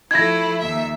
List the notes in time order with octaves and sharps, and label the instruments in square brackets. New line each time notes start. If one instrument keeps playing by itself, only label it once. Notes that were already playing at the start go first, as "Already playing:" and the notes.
[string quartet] F3 A3 [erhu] E4 [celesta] G#6 A#6
[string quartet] D#2 [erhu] E5